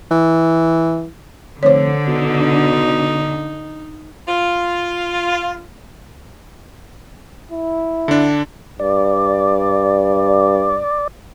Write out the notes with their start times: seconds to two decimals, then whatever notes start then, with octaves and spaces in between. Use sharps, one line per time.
0.11 E3
1.63 F1 D3 C5 C#5
2.07 B2 D#4
4.28 F4
7.51 E4
8.08 D3 D4
8.80 G2 D5